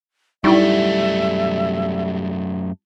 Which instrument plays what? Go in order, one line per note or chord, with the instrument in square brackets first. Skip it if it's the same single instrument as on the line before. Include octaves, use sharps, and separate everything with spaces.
[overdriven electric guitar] F#2 A3 [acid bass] G3 [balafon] D#4 E4 [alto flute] E5